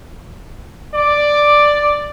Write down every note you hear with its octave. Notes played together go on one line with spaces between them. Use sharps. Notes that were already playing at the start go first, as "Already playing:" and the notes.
D5 D6